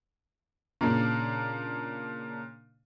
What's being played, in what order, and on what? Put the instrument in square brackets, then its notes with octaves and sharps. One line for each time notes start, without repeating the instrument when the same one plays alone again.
[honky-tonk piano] A#2 C#3 A#3 D4